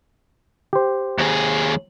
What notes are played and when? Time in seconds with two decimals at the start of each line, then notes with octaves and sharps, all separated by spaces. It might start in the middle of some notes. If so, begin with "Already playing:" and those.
0.73 G4 C5
1.18 D#2 G#4